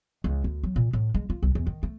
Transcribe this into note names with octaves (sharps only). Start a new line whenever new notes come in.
C#2
D2
F#3
A#2
A2
G#3
F4
C2
E2
D#3
A3